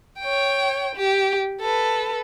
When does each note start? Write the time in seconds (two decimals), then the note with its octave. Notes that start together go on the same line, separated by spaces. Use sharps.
0.20 C#5 G5
0.96 G4
1.61 A4 B4